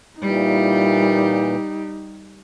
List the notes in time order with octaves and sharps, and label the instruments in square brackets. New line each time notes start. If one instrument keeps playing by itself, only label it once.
[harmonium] A#2 E3 [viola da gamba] G3 G4 [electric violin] D#4